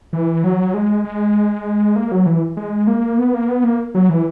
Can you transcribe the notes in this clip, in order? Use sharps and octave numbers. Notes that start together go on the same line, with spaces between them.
E3
F#3
G#3
G#3
A#3
F#3
E3
G#3
A#3
B3
A#3
B3
A#3
F#3
E3